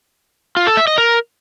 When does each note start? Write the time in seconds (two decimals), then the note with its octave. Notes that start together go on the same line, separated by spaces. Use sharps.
0.57 F4
0.67 A4
0.77 E5
0.87 D#5
0.98 A#4